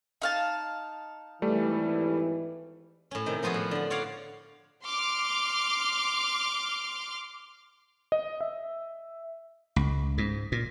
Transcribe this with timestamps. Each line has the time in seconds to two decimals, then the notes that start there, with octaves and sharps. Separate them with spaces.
0.22 D#4 F5 A5
1.42 G#1 E3 G3 A3
3.11 A2 C#4
3.26 C3 D#3
3.43 F3 B3 F4 F#4 G#4
3.54 A2
3.71 D3 F#4
3.90 F4 F#4 C#5 D5 F5 F#5
4.85 C6 D6 F6
8.12 D#5
8.41 E5
9.76 C#2
10.18 G#2
10.52 A#2